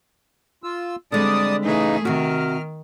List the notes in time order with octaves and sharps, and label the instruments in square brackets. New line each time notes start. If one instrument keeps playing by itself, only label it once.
[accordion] F4 E6
[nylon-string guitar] D3 G#3 C4 [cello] G3 [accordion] D5 A5 D#6
[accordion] C#3 E3 D#4 [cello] A3 G#4
[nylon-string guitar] C3 F#4 [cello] D#3 [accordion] F6